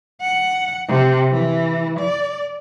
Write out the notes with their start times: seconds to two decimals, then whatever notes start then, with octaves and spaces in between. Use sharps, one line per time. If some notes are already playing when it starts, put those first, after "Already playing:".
0.21 F#5
0.88 C3
1.31 E3
1.99 D5